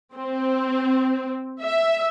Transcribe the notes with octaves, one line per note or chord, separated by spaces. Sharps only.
C4
E5